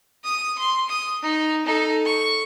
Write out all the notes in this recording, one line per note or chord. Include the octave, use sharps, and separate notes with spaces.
D#6
C6
D#6
D#4
D#4 A4
C#6